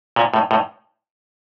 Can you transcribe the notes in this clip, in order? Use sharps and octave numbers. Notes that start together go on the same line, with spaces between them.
A#2
A2
A2